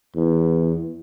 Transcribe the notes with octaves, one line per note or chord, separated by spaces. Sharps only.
E2